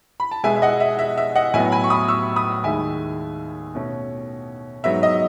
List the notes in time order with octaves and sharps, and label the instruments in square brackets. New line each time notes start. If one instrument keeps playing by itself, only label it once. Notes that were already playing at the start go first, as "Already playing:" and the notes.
[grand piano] B5
A5
B2 G#3 B3 E5 G#5
E5
D#5 F#5
E5
E5
E5
D#5 F#5
A2 F#3 B3 E5 G#5
G#5 B5
C#6
B5 D#6
C#6 E6
B5 D#6
D#2 D#3 G#3 E5 G#5
B2 A3 C#4
G#2 F#3 B3 E5
D#5